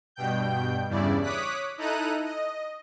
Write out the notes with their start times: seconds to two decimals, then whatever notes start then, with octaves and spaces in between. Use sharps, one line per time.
0.16 G2 B2 G5 G6
0.89 E2 G2 C#3 E4 D5
1.22 C#5 D6 D#6 F#6 B6
1.78 D#4 E4 A4 A#5 F#6 D#7
2.24 D#5